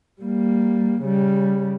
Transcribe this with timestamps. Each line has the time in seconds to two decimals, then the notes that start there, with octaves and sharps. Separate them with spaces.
0.22 G3 A#3
1.02 C#3 G3